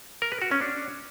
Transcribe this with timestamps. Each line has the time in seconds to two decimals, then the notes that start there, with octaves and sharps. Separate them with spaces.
0.22 A#4
0.32 B4
0.42 F#4
0.51 C#4
0.61 D4